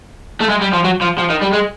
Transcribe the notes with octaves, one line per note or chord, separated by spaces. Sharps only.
A3
G#3
G3
F3
F#3
F3
F3
D#3
G3
G#3